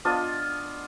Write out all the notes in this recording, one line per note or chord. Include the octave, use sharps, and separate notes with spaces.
B3 D4 F4 D#5